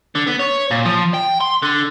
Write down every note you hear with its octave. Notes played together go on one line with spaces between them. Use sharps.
D3
B3
C#5
A#2
F3
G5
C6
D3